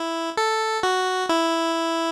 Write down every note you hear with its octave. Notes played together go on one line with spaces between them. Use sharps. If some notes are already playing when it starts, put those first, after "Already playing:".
Already playing: E4
A4
F#4
E4